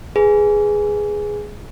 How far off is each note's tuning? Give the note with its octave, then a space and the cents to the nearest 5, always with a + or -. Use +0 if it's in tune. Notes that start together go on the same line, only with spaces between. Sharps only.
G#4 +0 B4 +0